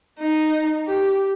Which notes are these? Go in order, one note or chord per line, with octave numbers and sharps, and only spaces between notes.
D#4
G4